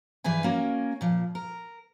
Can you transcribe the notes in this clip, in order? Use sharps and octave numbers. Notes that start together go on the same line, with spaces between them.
G2 E3 G#4 B4 G#5
A#3 C#4 F#4 A#4
A#2 F3
A#4